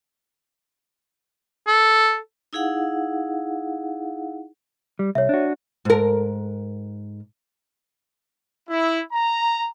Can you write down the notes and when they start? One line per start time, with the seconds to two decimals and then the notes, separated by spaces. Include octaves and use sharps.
1.67 A4
2.53 D#4 E4 G#4 F5 F#5
4.99 G3
5.15 C2 C#5 E5
5.29 D4 F#4
5.85 G#2 A#4
8.69 E4
9.13 A#5